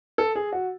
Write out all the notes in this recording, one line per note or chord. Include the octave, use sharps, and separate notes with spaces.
A4
G#4
F#4